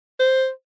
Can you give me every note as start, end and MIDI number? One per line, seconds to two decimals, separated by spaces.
0.20 0.49 72